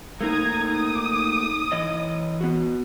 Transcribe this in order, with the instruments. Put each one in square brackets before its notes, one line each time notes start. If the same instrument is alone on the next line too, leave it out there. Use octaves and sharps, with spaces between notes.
[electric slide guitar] A3 A#3 D#4 [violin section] A#5 D#6 G#6
[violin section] D#6
[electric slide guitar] E3 C#5 D#5
B3 F#4